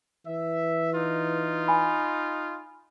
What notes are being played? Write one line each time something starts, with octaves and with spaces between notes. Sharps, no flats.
E3 E5
D#4 F4
G#5 B5